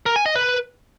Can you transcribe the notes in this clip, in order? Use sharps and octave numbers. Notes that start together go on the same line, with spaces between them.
A#4
G#5
D#5
B4